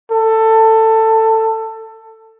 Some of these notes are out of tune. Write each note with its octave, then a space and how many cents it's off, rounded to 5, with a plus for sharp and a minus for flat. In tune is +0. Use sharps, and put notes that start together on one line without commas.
A4 +15